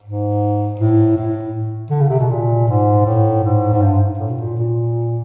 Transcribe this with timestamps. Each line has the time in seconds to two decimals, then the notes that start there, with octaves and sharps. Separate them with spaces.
0.03 G#2
0.80 A2
1.17 A2
1.91 D3
2.01 C#3
2.10 C3
2.20 B2
2.30 A#2
2.68 G#2
3.06 A2
3.44 G#2
3.73 G#2
3.82 G2
4.19 A2
4.30 B2
4.38 A#2
4.57 A#2